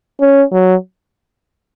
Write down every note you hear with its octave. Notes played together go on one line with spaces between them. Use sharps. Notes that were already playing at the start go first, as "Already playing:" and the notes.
C#4
F#3